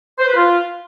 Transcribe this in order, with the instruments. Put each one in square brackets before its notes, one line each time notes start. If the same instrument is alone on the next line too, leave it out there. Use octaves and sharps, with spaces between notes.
[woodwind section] C5
B4
F4